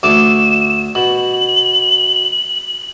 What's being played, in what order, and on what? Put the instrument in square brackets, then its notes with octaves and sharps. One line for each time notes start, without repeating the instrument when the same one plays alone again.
[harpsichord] D2 A3 D6 [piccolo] E7
[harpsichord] B2 [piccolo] F#7